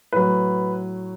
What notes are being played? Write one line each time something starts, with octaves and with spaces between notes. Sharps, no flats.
A2 F#3 B4